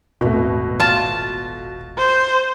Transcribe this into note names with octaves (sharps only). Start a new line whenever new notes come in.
D#1 G#1 B2 A3
F4 A5
C5